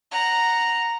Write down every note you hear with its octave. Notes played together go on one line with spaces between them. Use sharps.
F#5 A#5